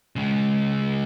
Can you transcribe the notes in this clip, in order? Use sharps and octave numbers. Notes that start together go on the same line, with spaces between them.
C#3 G#3